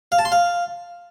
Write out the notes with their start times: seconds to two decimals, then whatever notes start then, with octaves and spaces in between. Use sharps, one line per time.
0.12 F5
0.19 A5
0.25 C6
0.32 F5